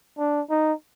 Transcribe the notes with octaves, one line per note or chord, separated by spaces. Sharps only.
D4
D#4